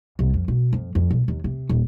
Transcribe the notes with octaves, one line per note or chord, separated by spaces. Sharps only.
C2
F2
B2
F2
F2
B1
D#2
C3
D#1